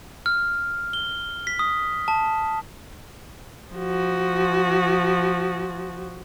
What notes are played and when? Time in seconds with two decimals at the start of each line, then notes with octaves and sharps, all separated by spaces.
0.26 F6
0.93 G7
1.47 B6
1.59 D#6
2.08 A5
3.75 F3 F#4